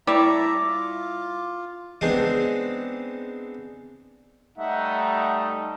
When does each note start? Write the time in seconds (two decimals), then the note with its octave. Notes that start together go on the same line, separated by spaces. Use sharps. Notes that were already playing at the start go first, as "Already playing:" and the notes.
0.07 G3 E4 C#5 E5 A5 A#5 D6
0.67 F4
2.01 G#3 B3 C4 D4 D#4 G#4
4.58 G3 A3 D#4 E5 F#5